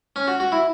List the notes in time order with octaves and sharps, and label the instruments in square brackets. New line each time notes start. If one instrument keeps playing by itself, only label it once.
[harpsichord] C#4
F#4
F#4
E4